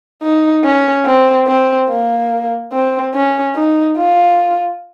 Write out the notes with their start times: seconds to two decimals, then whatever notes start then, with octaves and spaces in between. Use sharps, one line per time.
0.23 D#4
0.64 C#4
1.06 C4
1.47 C4
1.90 A#3
2.73 C4
3.14 C#4
3.56 D#4
3.98 F4